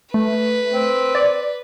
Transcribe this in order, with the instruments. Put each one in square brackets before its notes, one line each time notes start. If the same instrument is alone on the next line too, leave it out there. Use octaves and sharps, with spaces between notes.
[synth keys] A3 [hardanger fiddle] B4
[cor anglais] C4
[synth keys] D5